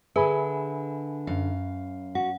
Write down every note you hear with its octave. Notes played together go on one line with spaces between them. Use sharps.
D3 G#4 B4 E5 G#5 B5
F#2 F5
F#4 F#5